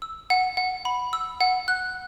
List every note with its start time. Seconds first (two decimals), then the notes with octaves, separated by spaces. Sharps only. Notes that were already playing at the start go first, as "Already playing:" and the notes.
0.02 E6
0.30 F#5
0.57 F#5
0.85 B5
1.13 E6
1.41 F#5
1.68 F#6